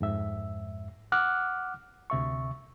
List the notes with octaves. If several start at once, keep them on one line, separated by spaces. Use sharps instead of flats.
F2 G#2 E5
F#5 D6 F6 F#6
D2 C3 E5 C#6